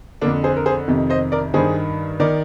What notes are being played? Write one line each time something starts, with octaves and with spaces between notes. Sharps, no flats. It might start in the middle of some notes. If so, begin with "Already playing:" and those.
F2 D3 A#3 D4
G#4 C5
A#4
G#4 C5
F2 C3 D#3
C5 D#5
A#4 D5
G2 D#3 G#4 C5
D#3 A#4 D5